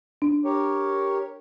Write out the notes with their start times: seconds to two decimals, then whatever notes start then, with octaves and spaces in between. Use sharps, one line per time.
0.22 D4
0.45 G4 A#4 C#5